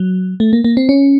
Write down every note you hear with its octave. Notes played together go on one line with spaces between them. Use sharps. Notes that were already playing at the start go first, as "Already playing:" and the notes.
Already playing: F#3
A3
A#3
A#3
C4
C#4